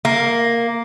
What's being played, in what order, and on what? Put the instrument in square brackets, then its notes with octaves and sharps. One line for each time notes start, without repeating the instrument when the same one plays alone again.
[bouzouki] A#3